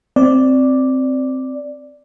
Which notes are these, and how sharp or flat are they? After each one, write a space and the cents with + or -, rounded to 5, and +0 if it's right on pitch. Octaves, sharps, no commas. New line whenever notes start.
C4 +0 D5 +0